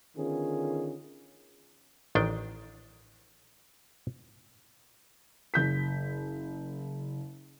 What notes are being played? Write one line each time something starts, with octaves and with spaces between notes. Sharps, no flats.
D3 D#3 B3 C#4 F4 G#4
A1 D#3 D4 G5
F#1 G6 B6